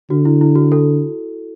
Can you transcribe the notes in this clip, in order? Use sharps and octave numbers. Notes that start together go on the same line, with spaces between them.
D3 F#4
E4
E4
F#4
A4